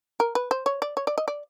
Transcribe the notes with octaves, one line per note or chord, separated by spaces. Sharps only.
A#4
B4
C5
C#5
D5
C#5
D5
D#5
D5